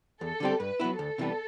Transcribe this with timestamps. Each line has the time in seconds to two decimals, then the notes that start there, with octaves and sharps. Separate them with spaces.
0.21 E2 A4
0.40 D3 G3 C4 G4
0.60 G2 B4
0.80 F#3 B3 E4
0.99 D2 A4
1.18 C3 E3 G3 B3